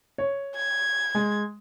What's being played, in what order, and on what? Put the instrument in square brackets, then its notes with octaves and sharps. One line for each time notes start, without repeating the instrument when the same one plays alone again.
[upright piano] C#5
[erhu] G#6
[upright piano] G#3